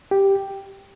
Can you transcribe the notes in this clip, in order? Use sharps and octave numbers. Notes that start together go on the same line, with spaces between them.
G4